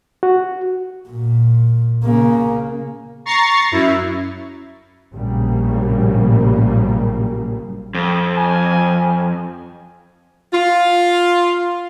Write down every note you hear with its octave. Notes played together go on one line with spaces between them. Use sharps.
F#4
A#2
C#3 A#3
A#5 C#6 A6 C7
F#2 E4
A#1 A2 C#3 F#3 G3 A#3
F2
G#5
F4